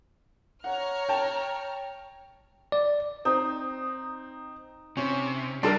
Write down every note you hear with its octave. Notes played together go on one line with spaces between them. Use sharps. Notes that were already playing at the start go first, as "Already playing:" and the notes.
C#5 F#5 A#5 F6
G5 A5
D5
C4 D#4
C3 C#4
G3 D4 A4 A#4 E5 A5 C6